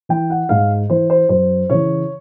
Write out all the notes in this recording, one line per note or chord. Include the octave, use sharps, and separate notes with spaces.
E3 G5
F#5
G#2 F5
E3 C5
C5
F#2 C5
C#3 E3 C#5